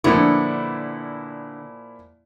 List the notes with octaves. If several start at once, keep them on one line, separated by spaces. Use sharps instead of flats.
A#2 D3 F3 B3 E4